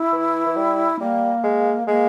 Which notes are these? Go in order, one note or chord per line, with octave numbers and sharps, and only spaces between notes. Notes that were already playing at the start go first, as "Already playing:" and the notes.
Already playing: E4
E3
E3
G3
G3 A#3
G#3
G#3 A#3